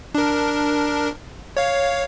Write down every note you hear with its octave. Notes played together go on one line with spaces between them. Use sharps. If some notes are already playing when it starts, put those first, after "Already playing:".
D4 A#4
C#5 F5